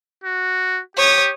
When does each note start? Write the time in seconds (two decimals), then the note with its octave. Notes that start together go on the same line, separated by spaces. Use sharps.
0.24 F#4
0.97 G4 C#5 D#6